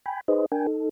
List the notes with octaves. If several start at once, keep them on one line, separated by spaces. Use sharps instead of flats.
G5 G#5 B5
D#4 G#4 B4 C5 D#5
D4 A#4 G5 G#5
D#4 A4